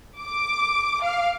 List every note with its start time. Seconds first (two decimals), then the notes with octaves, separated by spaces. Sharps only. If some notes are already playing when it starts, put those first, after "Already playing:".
0.19 D6
1.03 F5